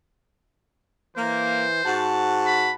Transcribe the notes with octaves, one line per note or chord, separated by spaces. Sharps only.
E3 A#3 C5
G#2 F#4 F#5 A5
B5